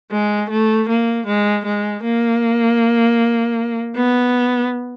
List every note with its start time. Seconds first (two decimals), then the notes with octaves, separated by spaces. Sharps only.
0.11 G#3
0.50 A3
0.89 A#3
1.26 G#3
1.66 G#3
2.04 A#3
3.96 B3